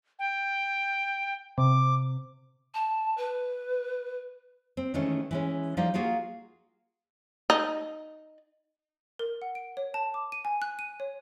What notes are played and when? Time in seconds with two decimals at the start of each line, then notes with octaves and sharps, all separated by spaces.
0.19 G5
1.58 C3 D6
2.74 A5
3.17 B4
4.77 C4
4.94 D#3 E3 G#3 A3 C#4
5.31 E3 G#3 C#4
5.77 F3 G3 D#4 F4 D5
5.94 A#3 F4 F#4 G#4
7.50 D#4
9.19 A#4
9.42 F#5
9.55 D7
9.77 C#5
9.94 A5
10.14 D6
10.32 D#7
10.45 G#5
10.62 F#6
10.79 D#7
11.00 C#5